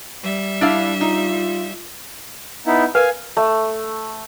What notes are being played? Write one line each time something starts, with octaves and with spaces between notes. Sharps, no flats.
G3 E5
D4 E4 F5
D#4 F4
B3 D#4 E4
A#4 B4 F5 G#5
A3